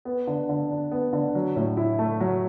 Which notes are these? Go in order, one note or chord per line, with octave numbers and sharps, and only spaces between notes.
B3
D3
D3
D4
B3
D3
F#3
A2
E4
A3
F#3